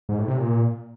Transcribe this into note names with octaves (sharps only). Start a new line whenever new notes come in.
G#2
A2
C3
A#2